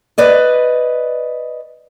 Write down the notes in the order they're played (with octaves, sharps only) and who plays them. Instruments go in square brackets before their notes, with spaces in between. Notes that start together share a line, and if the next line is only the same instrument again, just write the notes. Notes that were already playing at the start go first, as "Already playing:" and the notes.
[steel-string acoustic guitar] B4 D5 D#5